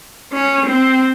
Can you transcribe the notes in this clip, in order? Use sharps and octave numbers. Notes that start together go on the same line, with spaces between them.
C#4
C4